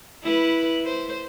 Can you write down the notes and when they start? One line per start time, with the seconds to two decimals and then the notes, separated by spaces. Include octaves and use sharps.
0.23 E4 B4
0.85 C5